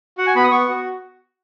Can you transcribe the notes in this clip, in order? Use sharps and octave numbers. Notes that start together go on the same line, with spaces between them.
F#4 F#5
G#5
B3 B5
D#6
B3 C#6
F#4